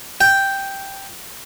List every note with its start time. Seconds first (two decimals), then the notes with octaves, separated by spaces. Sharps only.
0.21 G5